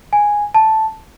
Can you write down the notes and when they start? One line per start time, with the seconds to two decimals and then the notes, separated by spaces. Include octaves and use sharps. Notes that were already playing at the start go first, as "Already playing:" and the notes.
0.13 G#5
0.55 A5